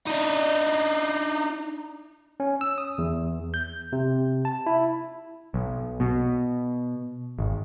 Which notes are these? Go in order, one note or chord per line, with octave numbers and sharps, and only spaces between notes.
D4 D#4
C#4
E6
D#6
E2
G6
C3
A5
E4
B1
B2
G#1